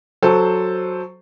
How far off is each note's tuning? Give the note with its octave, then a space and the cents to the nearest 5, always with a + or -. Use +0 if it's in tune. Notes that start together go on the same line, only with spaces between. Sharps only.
F#3 -5 A4 +0 C5 +0